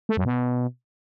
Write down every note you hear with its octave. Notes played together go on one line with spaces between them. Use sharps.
A3
F#2
B2